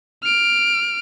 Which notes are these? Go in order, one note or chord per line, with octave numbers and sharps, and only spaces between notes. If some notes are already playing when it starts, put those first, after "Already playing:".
F6 D7